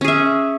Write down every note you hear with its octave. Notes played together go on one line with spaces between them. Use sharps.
C#4 G#4 E5